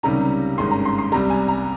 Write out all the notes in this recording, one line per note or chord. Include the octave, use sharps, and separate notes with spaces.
C#2 C3 D#3 G3 C#4 A#5
G#1 G2 D#3 G#3 C#4 C6
A#5
C6
C6
C2 C3 G3 A#5
G#5
A#5